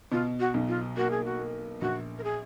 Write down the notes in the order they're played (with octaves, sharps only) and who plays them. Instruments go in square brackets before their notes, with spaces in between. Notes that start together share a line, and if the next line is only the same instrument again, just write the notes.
[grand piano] B2 [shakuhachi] F4
[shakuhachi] F#4
[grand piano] B1
[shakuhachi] F4
[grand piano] A#3 [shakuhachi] F#4
[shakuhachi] G#4
F#4
[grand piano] A#3
[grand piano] A#1 [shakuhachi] F#4
[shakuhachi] A#4
G#4